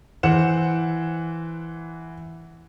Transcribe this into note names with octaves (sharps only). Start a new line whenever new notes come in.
E3 C5 F#5 E7